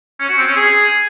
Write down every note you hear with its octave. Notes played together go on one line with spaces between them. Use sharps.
C#4
F#4
C4
C#4
G#4